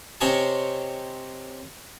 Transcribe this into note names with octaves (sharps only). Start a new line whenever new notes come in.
C3 C4 C#5 D#5 G#5 A5